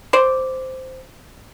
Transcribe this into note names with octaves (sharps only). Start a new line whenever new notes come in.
C5 D5